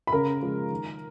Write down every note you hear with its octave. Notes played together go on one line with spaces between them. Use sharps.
B5
C#3 A#4 A#5
F3 G#3
D#3